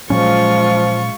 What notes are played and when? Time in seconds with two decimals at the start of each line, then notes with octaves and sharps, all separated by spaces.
0.10 A#2 F3 F#3 G#3 C#4 F4 C#6